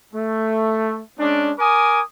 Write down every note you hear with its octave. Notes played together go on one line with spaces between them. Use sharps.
A3
G#3 C#4 D4
A#4 G#5 D6 D#6